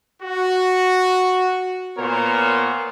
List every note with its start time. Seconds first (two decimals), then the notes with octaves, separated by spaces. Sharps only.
0.22 F#4
1.98 A#2 B3 A#4 C5 C#5